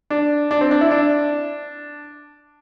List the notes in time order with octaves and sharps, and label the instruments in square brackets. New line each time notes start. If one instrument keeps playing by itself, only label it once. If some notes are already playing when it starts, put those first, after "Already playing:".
[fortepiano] D4
D4
C4
D4
E4
D4